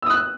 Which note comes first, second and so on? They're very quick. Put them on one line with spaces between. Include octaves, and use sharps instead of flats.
E6 D#6 F#6